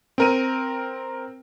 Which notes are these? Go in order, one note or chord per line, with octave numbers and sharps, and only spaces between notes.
C4 A#4 D#7